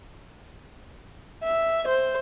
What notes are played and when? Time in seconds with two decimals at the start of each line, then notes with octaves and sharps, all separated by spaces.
1.44 E5
1.88 C5